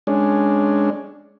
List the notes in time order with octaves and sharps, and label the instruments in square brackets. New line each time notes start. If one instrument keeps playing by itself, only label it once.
[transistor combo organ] G#3 C#4 D4